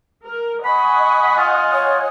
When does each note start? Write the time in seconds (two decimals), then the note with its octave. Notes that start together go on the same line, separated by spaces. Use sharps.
0.25 A#4
0.65 D#5 F#5 G#5 B5 C#6
1.37 F4
1.73 C#5